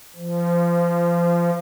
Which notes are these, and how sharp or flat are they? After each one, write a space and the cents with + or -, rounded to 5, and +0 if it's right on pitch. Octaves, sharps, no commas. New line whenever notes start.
F3 -25